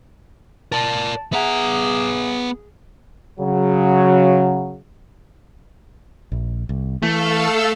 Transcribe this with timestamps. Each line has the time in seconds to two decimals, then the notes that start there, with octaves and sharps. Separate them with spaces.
0.72 A#4 D5 A5 A6
1.33 B3 G#4 E5 F#5 G#5 A#5
3.40 C#3 F#3
6.32 A#1
6.69 C2
7.02 E3 A3 A4 F5 E6